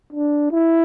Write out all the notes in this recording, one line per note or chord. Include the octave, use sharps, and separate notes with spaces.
D4
E4